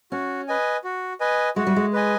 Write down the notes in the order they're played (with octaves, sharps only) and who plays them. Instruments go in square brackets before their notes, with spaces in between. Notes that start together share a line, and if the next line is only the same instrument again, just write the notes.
[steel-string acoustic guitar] C#4 [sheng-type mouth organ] F#4
[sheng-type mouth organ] B4 D#5 G#5
F#4
B4 D#5 G#5
[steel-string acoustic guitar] G#3 [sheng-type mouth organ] F#4
[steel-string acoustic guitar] G3
G#3
[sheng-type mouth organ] B4 D#5 G#5